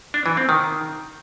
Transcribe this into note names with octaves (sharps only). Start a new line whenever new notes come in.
D4
E3
C4
D#3